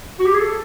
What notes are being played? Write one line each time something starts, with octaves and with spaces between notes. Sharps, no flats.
F#4
G4
G#4
A4